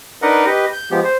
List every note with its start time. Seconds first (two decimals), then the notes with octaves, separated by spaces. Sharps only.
0.22 D4 D#4 A#4 B4 D#5 F#5
0.46 G4 B4 D#5
0.73 G6
0.91 F3 G#3 B3 G4
1.04 C5